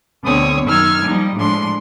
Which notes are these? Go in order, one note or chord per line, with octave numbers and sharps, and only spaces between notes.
D2 B2 D3 C4 C#5 D#6
F#2 D#3 D#4 E6 F6 G#6
F3 G3 A#3 D#4
A2 F3 G#3 D4 C6